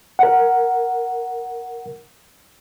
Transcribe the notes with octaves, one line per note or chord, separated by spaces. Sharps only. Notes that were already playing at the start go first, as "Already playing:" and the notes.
A#4 F#5